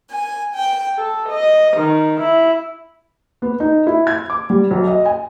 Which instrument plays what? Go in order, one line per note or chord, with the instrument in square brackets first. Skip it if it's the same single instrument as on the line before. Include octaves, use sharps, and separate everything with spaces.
[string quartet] G#5
G5
A4
D#5
D#3
E4
[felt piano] B3
D#4
E4
G#6
D6
G3
B1
D#5
G#5